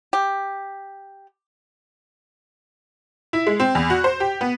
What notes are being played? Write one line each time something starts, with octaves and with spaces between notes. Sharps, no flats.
G4
E4
G#3
C4
E2
F#4
C5
G4
B3